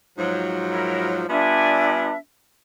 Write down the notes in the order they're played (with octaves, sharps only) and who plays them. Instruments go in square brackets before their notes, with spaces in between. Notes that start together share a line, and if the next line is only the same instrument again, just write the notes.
[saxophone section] G#2 F3 F#3
[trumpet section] E4 A#4
[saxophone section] G3 B3 F4 [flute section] D4 E5 [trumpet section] A4 D5 G#5